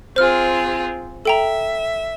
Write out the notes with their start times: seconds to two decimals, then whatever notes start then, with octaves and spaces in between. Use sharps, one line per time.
0.16 C4 F4 G#4 C5 F6
1.25 A4 E5 G5 A#5